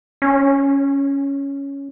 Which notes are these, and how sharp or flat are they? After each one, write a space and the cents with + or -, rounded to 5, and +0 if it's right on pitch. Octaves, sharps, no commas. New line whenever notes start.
C#4 +5